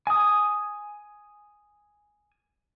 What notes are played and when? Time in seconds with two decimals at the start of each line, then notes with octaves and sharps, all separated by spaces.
0.07 G#5 D#6